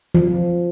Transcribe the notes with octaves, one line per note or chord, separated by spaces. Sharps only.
F3